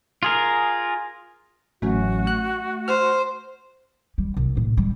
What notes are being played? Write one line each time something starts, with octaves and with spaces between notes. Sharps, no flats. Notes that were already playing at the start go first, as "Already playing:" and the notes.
F4 G#4 A#4
A1 F#3 A3 C#4 F#4
F#6
C5 F6
G3
C2
A2
G3